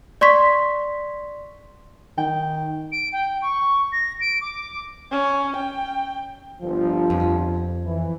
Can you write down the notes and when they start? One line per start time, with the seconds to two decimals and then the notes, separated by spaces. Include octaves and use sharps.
0.21 D5 C6 C#6 B6
2.18 D#3 G5
2.92 D7
3.12 G5
3.42 C#6
3.92 A#6
4.20 D7
4.41 D6
5.12 C#4
5.57 G5
6.62 G1 F3
7.10 F2
7.86 E3